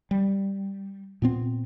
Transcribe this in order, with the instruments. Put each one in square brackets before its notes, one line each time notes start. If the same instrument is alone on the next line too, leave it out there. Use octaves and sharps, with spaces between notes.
[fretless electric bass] G3
A#2 B3 C4